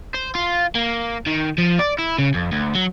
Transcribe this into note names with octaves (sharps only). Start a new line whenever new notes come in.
C5
F4
A#3
D#3
F3
D5
E4
C#3
F2
D2
F#3